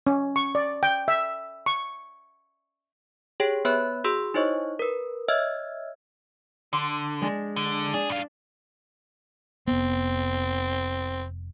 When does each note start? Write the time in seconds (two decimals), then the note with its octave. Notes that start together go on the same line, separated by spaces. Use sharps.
0.07 C#4
0.36 C#6
0.55 D5
0.83 G5
1.08 E5
1.66 C#6
3.40 G4 G#4 C#5 G5
3.65 B3 B4 C#5 E5 B5 F#6
4.04 F#4 G#4 C6 E6
4.34 D#4 E4 C5 C#5 D#5 C#6
4.79 A#4 B4
5.28 C#5 D#5 E5 E6 F6 G#6
6.73 D3 C6 D6
7.22 G#3 D4
7.56 D3
7.94 D4 G#4
8.09 G2 F5
9.68 F1 B3 C4